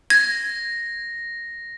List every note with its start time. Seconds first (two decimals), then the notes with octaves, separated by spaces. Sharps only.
0.10 G#6 A#6